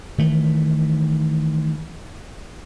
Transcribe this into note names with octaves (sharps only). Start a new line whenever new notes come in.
D#3 E3 A3